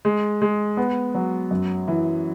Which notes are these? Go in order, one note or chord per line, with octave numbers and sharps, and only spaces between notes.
G#3
G#3
B3
F#3
F#2
E3